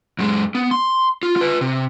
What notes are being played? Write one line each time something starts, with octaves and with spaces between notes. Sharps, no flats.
F#2 G#3
B3
C6
F4
F4 B4
C3